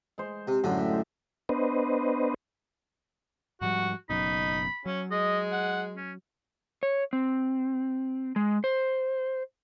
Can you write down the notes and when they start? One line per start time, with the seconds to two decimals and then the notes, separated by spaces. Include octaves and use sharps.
0.18 G#3 C5
0.47 C3
0.64 F#2 A2 D3
0.78 G4 E5
0.90 G#3 C5
1.49 B3 D4 B4 C5 D#5
3.61 G#2 F3 G3 F#4
4.10 F#1 F#2 B2 D#4 B5
4.86 F#3 C#4
5.11 G#3 D#5
5.52 F#5
5.96 C#4
6.83 C#5
7.13 C4
8.36 G#3
8.64 C5